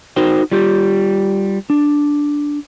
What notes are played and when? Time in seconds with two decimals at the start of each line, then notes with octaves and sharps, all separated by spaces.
0.16 D#4 F#4 A#4 C5 G5
0.52 G3 F4 G4
1.70 D4